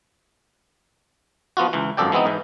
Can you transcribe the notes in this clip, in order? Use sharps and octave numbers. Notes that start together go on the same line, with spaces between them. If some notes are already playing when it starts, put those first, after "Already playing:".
F3 B3 F4 F#4
C#2 E3
G#1 F#2 F3 A4 D5 G5
E3 G#3 B3 C4 D#4
G#2 E3